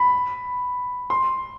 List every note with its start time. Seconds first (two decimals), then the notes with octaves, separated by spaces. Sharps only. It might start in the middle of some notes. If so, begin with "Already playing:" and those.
Already playing: B5
1.10 C6